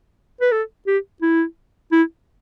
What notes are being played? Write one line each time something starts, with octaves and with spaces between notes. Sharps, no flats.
B4
A4
G4
E4
E4